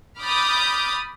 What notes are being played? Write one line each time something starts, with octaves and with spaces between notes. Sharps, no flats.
B5 D6 D#6 F6 G6 A6